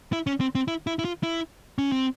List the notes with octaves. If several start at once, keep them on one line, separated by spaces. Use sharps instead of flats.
E4
C#4
C4
C4
E4
E4
E4
F4
E4
C#4
C4